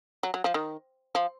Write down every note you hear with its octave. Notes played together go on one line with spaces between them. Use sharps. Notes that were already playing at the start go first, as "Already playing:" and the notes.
F#3
F#3
F3
D#3
F3